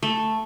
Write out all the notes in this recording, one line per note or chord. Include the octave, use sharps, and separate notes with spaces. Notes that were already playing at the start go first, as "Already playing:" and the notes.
A3